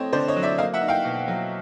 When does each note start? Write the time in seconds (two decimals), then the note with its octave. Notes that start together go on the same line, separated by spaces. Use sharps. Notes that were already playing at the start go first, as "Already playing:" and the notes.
Already playing: A3 C4 C#5 D#5
0.12 D3 C5 D5
0.28 C#5 D#5
0.36 F#3
0.43 D5 E5
0.58 A#3 D#5 F5
0.74 E5 F#5
0.81 D#4
0.88 F5 G5
1.05 B2
1.28 F#3